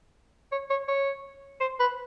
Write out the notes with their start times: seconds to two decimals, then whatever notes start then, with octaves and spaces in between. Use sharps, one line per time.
0.52 C#5
0.70 C#5
0.88 C#5
1.61 C5
1.80 B4